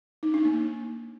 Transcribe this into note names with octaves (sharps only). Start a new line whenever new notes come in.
D#4
D4
A#3